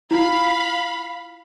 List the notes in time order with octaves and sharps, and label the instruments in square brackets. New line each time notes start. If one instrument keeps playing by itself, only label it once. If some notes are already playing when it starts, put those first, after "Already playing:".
[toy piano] E4 F4 [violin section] F5 B5